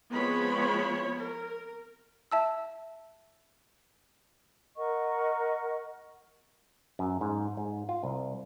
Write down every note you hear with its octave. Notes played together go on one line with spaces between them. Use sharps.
F3 G#3 B3 C4 C#5 B5
A#4
E5 A5 E6
A#4 D#5 F#5 C#6
F#2
G#2
G#2
F4
C2